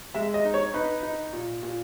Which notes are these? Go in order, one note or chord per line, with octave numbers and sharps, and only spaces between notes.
G#3 E5
D#5
D#4
C#5
D#4 B4
D#4
A#2
A#2